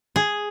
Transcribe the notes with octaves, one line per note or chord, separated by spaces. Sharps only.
G#4